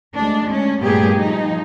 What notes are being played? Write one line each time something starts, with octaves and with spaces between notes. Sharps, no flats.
D2 G#3 D4
C#4
G2 A#2 A3 B3 G4 G#4
F3 D#4